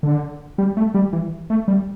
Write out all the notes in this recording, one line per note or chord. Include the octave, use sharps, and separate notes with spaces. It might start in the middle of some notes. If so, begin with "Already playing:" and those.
D3
G3
A3
G3
E3
A3
G3